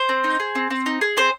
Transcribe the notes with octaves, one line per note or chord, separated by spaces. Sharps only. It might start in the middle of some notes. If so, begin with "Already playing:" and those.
Already playing: C5
C4
D#4
G#4
C4
C4
D#4
G#4
C4 C5